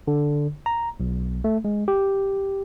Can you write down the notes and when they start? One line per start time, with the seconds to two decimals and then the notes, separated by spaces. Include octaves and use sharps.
0.07 D3
0.66 A#5
1.00 B1
1.44 A3
1.65 G#3
1.88 G4